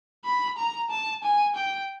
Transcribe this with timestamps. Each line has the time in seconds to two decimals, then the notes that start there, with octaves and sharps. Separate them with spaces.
0.25 B5
0.58 A#5
0.90 A5
1.23 G#5
1.56 G5